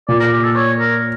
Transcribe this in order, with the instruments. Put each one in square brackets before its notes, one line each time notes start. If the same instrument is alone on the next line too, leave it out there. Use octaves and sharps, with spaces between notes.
[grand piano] A#2 [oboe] D5
[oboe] A#4
G4
A4
C#5
A#4